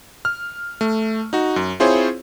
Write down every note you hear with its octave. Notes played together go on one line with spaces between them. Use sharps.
F6
A3
D#4 F#4
F#2
C4 E4 F4 G#4 C5 C#5